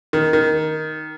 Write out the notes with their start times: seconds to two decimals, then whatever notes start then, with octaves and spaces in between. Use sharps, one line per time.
0.13 D#3
0.33 D#3